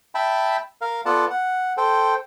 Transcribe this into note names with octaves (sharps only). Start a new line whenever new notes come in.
E5 G5 A5 B5
A#4 F5
B3 F4 A4 D5 F#5 A5
F#5
A4 C5 G5